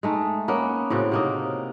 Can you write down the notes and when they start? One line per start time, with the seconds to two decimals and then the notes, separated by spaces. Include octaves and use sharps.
0.03 G#3 A3 D#4
0.48 A#3 B3 C#4
0.90 A2 C#3 C4 F#4
1.12 C3 A#3 D#4